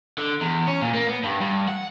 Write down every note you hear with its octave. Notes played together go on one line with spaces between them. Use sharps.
D3
E2
C#4
A#2
A#3
B3
G2
G2
F#5